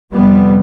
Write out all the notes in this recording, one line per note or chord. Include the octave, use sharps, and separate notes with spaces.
F2 C3 G3 B3